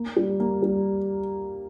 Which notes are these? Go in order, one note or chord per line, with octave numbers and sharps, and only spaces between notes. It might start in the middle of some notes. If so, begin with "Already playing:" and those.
Already playing: A#3
G3
A#3
G3